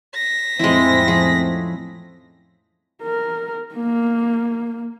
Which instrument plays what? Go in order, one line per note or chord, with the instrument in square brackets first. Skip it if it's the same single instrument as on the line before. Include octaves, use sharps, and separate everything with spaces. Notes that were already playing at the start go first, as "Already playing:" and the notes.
[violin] A#6 B6
[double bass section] F2 A2 C4 [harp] F3 [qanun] G#3 E4
[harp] F3 A3 C#4 [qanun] G#4
[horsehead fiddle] A#4
A#3